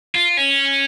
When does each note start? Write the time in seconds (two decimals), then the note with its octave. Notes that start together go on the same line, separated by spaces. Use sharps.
0.15 F4
0.37 C#4